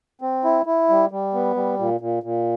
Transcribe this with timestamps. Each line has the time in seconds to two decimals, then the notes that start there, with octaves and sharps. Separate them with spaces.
0.21 C4
0.44 E4
0.66 E4
0.89 G3
1.11 G3
1.34 B3
1.56 G3
1.79 A#2
2.01 A#2
2.23 A#2